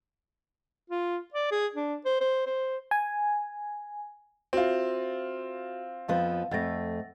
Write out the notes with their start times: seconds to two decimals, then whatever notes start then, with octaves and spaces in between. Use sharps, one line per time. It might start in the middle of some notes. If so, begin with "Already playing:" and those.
0.90 F4
1.34 D5
1.51 G#4
1.75 D4
2.06 C5
2.21 C5
2.46 C5
2.91 G#5
4.53 C4 F4 F#4 E5
6.08 F2 F3 B3 F5
6.51 F2 A3 F#5 A6 A#6